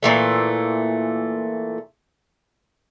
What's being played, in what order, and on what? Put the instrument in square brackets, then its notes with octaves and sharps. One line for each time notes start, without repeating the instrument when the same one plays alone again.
[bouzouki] A#2 E3 A3